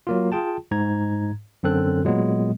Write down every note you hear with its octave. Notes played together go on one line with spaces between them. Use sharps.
F#3 A#3 F4
F4 G#4 G5 A5
G#2 A#5 G#6
F#2 D3 C4 A4 F#6
A#2 F#3 G#3 B3